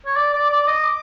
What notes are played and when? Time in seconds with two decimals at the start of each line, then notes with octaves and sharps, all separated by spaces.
0.06 C#5
0.16 D5 D6
0.33 D5
0.50 D5
0.67 D#5